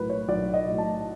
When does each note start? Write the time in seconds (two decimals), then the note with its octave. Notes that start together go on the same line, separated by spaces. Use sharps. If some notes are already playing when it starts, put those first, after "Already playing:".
Already playing: B1 A2 F#3 A#4 B4
0.10 C#5
0.29 B1 D5
0.54 D#5
0.66 A2 F#3
0.78 A5